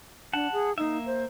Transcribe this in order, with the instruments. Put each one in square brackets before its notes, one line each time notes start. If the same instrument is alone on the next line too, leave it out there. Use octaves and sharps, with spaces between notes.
[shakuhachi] D4 [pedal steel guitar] F#5 A5
[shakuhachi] G#4
[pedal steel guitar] A#3 E5 [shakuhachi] D#4
[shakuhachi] C5